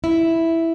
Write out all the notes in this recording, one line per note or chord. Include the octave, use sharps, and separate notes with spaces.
E4